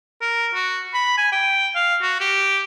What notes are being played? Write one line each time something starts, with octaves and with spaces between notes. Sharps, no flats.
A#4
F#4
B5
G#5
G5
F5
F#4
G4